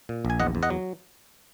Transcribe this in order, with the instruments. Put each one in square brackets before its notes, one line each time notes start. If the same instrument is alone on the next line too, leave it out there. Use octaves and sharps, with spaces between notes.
[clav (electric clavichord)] A#2
A#1
G#5
E2 D#5 F#5
E2
D#5 F#5
F#3